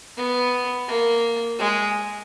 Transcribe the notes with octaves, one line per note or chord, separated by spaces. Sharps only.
B3
A#3
G#3